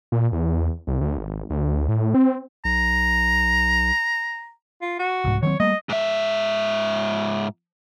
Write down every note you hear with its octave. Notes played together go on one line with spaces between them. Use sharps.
A#2
E2
C2
D2
G#1
D2
A2
C4
B1 A#5
F4
F#4
C2 G#2
D#3 F#3 C4 C#5
G3 A3 A#3 D#5
G#2 E5